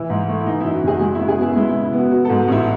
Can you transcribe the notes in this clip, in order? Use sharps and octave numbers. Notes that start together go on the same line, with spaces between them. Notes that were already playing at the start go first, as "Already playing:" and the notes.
Already playing: E3 E4
G#2
A3
E4
E3 D#4
F#2 E4
F#4
F#1 G#4
G#3 F#4
C#3 E4
G#4
B3 E4
G#3 E4
E4
C#3
E4
B3 F#4
F#3 F#4
G#2 A4
A1 E4